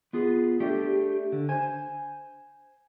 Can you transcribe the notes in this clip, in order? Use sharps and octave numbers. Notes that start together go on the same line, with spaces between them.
B3 F4 G#4
A3 D4 G4
D3
C5 G#5